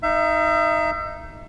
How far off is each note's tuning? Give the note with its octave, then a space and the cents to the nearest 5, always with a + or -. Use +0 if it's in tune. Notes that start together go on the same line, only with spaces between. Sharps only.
D#4 +0 E5 +35